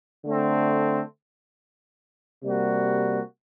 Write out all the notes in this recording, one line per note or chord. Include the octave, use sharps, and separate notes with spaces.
D3 A3 C4
C3 G3 A#3 F#4